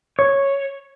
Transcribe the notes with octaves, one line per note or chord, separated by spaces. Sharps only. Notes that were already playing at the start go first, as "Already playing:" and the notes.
C#5